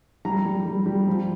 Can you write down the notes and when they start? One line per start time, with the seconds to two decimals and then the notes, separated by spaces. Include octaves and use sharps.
0.25 G3 A#5
0.45 G3
0.65 G3
0.86 G3
1.07 F3